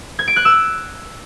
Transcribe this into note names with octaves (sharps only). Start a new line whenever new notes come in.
G#6
D7
F#6
E6